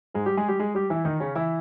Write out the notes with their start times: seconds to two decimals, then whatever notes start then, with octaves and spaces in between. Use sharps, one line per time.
0.14 G#2 G#3
0.26 G3 G4
0.37 G#3 G#4
0.48 G3 G4
0.59 G#3 G#4
0.74 G3 G4
0.90 E3 E4
1.05 D#3 D#4
1.20 C#3 C#4
1.35 E3 E4